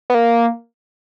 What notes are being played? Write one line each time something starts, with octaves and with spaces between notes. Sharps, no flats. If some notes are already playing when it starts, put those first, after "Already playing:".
B3
A#3